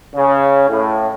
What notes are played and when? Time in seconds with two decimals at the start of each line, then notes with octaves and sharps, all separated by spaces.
0.14 C#3
0.69 A2